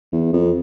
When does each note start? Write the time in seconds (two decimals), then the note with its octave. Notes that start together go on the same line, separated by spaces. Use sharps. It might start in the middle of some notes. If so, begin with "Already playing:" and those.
0.12 E2
0.33 F2